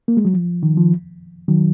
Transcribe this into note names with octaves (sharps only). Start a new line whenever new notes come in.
A#3
G#3
F#3
F3
D#3
F3
D#3 F#3